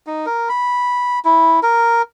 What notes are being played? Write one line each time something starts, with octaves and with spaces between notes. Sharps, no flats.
D#4
A#4
B5
E4
A#4